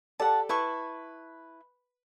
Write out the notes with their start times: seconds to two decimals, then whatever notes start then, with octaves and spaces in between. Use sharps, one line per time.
0.20 G4 A4 D5 F#5 A5
0.49 E4 B4 A5 C#6